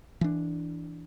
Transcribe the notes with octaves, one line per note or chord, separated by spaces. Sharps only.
E3 D4